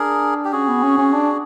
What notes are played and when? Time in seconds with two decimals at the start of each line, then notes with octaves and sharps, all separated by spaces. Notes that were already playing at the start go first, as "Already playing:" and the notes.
Already playing: D4 G#4 A#4
0.45 G4
0.53 C#4 F#4 G#4
0.68 B3
0.83 C#4
0.98 C#4
1.13 D4